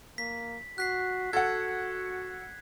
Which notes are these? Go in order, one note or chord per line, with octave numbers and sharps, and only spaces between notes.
A#3 B6
F#4 F#6 B6 C7
F#4 A4 F#5 G#6